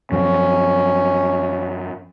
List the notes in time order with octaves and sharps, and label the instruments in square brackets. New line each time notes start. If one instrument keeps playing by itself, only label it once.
[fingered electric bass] F#2 F3 [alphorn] C#4